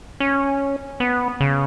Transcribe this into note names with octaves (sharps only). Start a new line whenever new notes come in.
C#4
B3
C#3